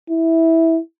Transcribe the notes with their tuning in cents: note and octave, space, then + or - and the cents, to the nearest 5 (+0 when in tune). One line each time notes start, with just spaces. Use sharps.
E4 -10